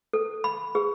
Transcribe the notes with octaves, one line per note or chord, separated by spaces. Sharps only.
A4
B5
G#4